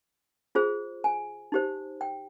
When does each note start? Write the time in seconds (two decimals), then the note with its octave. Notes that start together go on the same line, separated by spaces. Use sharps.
0.55 F4 G#4 C5
1.04 G#5
1.52 D#4 G4 C5
2.01 G5